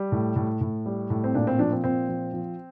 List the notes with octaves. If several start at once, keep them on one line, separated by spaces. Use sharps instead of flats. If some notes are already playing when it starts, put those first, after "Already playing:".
Already playing: G3
A2
A2
A2
G3
A2
C4
A#2 D4
C4
F3 D4
C4
A#2 C4
F3
F3